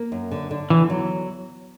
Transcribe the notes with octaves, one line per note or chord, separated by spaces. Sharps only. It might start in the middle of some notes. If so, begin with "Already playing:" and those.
Already playing: A#3
F#2
D3
D3
E2 E3
F#3